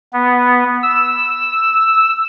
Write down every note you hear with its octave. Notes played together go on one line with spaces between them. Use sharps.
B3
E6